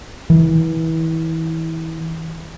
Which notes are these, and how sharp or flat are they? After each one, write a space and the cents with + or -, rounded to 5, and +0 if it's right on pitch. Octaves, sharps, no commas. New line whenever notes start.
E3 -30